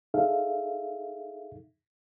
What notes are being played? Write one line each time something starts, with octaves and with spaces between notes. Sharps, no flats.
D#4 G#4 A4 E5 F5